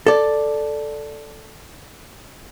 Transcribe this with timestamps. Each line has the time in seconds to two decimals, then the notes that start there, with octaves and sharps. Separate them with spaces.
0.06 A4 D5